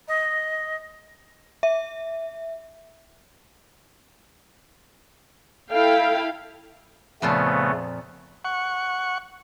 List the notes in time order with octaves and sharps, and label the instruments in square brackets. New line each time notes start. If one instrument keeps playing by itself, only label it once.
[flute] D#5
[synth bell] E5
[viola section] E4 A4 F5 G5
[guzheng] F2 A#2 F4 [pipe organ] C#3 A3 B3
[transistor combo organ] F#5 C#6